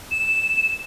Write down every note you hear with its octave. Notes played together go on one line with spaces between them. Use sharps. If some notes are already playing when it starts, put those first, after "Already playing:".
E7